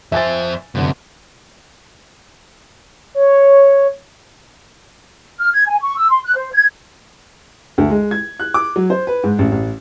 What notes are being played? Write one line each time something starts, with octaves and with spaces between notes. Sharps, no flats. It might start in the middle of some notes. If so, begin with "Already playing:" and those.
F2 C5 E5 G#5 A6
F1 F#2 D3
C#5
F6
G#6
G#5
C#6
E6
C6
F#6
C5
G#6
D2
G#3
G#6
F#6
D6
F#3
C5
B4
G#2
A1
A1